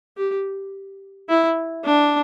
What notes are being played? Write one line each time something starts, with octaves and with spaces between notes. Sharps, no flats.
G4
E4
D4